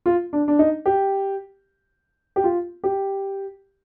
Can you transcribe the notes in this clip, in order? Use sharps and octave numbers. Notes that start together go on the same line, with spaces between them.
F4
D4
D4
D#4
G4
G4
F4
G4